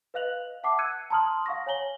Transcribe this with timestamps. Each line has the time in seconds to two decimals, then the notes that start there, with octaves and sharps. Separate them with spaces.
0.14 B4 D#5 F5 F#6 F7 F#7
0.63 E5 F#5 A5 D6 C7
0.78 E6 F#6 G#6 C#7 D#7
1.10 A5 A#5 C6 D#6 F6 F#7
1.46 F5 F#5 C#6 A#6
1.67 C#5 G#5 A#5 F#7 G7